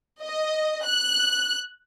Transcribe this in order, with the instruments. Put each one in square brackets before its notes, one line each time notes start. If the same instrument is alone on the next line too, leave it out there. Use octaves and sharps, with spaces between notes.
[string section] D#5
F#6